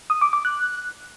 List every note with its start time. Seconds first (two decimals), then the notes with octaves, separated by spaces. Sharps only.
0.10 D#6
0.21 D6
0.33 D6
0.45 F#6